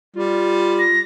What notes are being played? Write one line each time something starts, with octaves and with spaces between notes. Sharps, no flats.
G3 F4
A#6